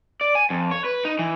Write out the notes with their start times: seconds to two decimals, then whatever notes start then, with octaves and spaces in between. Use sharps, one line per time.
0.21 D5
0.35 G#5
0.50 F2
0.71 C#5
0.84 B4
1.05 D#4
1.19 E3